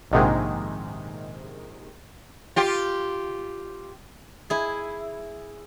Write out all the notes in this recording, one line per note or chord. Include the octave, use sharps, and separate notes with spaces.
A#1 G#2 C3 D#3 G#3
F4 G4
E4 G#4